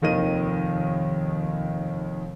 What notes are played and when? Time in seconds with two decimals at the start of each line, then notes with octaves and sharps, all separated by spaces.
0.02 F1 D#2 D#3 D#5 D#7